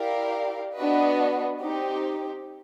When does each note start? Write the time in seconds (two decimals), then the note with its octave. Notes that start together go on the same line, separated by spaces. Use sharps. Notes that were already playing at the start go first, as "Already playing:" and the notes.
Already playing: E4 G4 A#4 D5 F5
0.76 B3 D4 F#4 B4 D#5
1.61 C4 D#4 G4